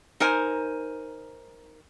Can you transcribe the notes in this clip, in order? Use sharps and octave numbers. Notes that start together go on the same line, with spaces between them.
D#4 A#4 C5 G#5